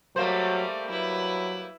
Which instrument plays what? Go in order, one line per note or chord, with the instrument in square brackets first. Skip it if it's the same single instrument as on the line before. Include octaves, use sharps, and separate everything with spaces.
[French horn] F#3 [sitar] G3 A#3 C5 [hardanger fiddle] A3
[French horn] F#3 [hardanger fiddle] E4 B4